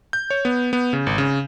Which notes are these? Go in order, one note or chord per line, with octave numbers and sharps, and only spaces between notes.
G6
C#5
B3
B3
C#3
G#1
C#3